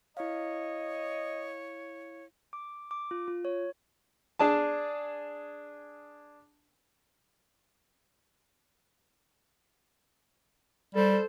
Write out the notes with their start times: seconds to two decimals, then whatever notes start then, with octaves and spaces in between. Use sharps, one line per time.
0.17 E4 C#5 D#5 F5
2.53 D6
2.91 D6
3.11 F4
3.28 F4
3.45 C#5
4.39 D4 G#4 A5
10.95 G3 A4 C5